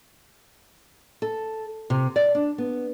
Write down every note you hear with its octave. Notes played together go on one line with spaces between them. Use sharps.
A4
C3
D5
D4
B3